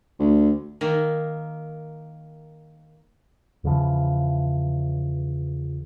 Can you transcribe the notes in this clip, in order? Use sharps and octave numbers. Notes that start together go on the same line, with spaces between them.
D2
D#3 A#3
E2 C#3 E3 F3